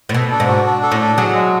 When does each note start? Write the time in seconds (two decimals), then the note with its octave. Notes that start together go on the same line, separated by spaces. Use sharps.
0.09 A2
0.14 B2 A4
0.32 D4
0.40 G#2
0.48 F#4
0.66 D4
0.83 A4
0.91 A2
1.00 D4
1.17 F#3 G#4
1.34 G#3